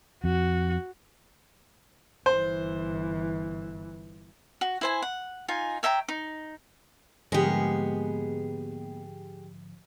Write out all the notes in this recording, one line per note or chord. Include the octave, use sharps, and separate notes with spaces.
F2 F#4
G1 E3 C5
F#4
E4 C5 G#5
F#5
D#4 F4 G#5
C#5 E5 G5 A#5
D#4
G#2 D3 F3 G#3 A#3 B3 G4 G#4